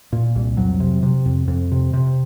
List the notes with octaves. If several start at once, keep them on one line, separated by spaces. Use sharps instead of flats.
A#2
C2
F2 F#3
C3
C3
F2
F2
C3
C3